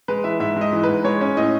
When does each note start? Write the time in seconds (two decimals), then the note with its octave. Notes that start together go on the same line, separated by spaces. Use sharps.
0.08 G#3 B4
0.24 E3 E5
0.40 G#2 E5
0.56 G#3 D#5
0.73 E3
0.83 B4
0.89 G#2
1.05 G#3 C#5
1.21 C#4
1.37 A2 D#5